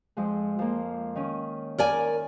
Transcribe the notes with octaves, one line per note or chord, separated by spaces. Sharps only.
F2 F3 G#3
F3 A#3
D#3 C#4
A#4 D5 G#5